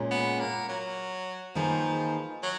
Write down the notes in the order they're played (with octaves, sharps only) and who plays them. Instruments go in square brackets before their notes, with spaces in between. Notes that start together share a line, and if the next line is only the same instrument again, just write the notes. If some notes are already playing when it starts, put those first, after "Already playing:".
Already playing: [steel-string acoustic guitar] A#2 G#3 C#4 G#4
[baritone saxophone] B3
A#3
F#3
[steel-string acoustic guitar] D#3 A#3 D#4 G#4 B4 [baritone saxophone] F3
[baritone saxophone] F#3